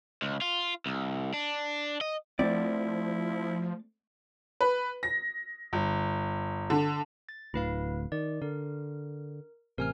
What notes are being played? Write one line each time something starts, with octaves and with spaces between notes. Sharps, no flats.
C#2
F4
C2
D4
D#5
F3 A3 A#3 C4 E4 D5
B4
A#6
G1
D3
A6
D1 D2 E4 B4 F5
D#3 D5
D3 A#4
A1 C3 A#4 G#5 F6